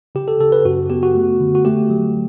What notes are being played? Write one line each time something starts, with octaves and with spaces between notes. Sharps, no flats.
C#3 G4
A4
C#3 A4
B4
F#2 F#4
B3 G4
F#4
A3
D3
F#4
A3 G4
F#3